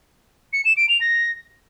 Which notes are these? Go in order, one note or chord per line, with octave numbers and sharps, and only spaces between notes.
C#7
E7
D7
F7
A#6